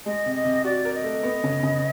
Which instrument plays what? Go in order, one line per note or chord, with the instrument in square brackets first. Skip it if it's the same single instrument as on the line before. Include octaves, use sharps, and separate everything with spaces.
[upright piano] G#3 [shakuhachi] D#5
[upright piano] C3
[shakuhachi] D#5
[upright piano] C3
[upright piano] F#4 [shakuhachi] D5
[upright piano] A#4
[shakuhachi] D#5
[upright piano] A3
B3
C#3
C#3